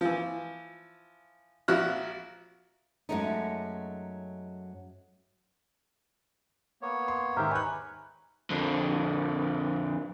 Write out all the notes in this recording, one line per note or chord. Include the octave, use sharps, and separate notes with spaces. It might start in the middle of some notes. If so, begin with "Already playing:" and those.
E3 F3
A#1 F3 F#4 E5 F6 F#6
F#2 F#3 G#3 A3 C#4 D#4
A#3 B3 C#5
C6
G#2 D#3 G4 C5 E5 A#5 F6
B4 C#5 G#5 F#6
F2 D3